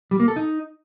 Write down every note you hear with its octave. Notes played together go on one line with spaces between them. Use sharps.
G3
A#3
A4
D#4